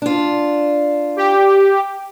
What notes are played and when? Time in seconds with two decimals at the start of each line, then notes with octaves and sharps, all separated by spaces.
0.02 D4 F4
1.16 G4